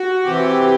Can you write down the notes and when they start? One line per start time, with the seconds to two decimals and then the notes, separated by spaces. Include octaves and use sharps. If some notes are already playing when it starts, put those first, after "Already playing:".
Already playing: F#4
0.24 C3 E3 G4